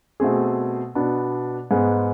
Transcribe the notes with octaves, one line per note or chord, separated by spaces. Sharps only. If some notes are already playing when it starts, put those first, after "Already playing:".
B2 A3 C4 G#4
B2 B3 D4
G#2 G#3 B3